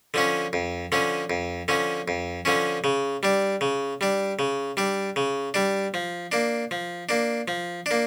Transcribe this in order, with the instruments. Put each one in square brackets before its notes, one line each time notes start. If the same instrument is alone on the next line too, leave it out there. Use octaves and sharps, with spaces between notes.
[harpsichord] D3 F3 C#4
F2
D3 F3 C#4
F2
D3 F3 C#4
F2
D3 F3 C#4
C#3
G3 D4
C#3
G3 D4
C#3
G3 D4
C#3
G3 D4
F3
A#3 D4
F3
A#3 D4
F3
A#3 D4